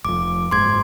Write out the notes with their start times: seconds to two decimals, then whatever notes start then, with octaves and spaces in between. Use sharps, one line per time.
0.05 F1 F2 D6
0.51 F#1 G#2 C6 D6 G#6